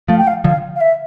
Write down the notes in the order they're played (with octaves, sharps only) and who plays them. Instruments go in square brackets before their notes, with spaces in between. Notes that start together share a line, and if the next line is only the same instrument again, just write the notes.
[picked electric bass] F3 A3 [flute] F5
[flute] G5
F5
[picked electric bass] D3 F3 [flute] F5
[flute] F5
E5